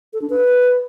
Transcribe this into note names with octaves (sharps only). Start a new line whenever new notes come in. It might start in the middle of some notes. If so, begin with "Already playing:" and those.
A4
D4
B4